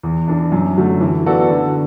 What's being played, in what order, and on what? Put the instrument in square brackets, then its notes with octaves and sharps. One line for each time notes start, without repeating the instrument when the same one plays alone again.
[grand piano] E2
E3 D4
F#2
D3 F#3 A3
E3
B3 F#4 A4 D5
D3